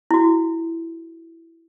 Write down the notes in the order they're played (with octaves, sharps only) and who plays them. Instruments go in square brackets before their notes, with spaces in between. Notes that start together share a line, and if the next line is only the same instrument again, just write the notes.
[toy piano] E4 F#4